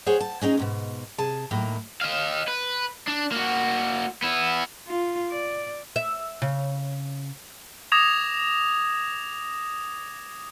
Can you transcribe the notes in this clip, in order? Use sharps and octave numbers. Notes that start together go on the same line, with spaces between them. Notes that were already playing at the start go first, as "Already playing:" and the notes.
G#4 C5 C#5 F#5
A5
G#3 C#4 D#4 G#4
D2 G#2 B2
C3 G#4 A5
D#2 A2 F#3 A#3
D#5 F5
B4
D4
A#3 F#4
B3 E4
F4
D5
E5
C#3
D6 D#6 G#6 A#6 E7 F7